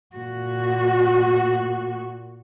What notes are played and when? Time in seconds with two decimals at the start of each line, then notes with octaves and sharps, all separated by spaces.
0.16 A#2 F#4